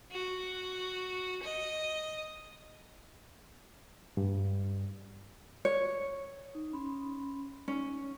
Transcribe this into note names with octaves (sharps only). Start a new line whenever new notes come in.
F#4
D#5
G2
C#5
D#4
C#4 B5 C6
C#4 D#4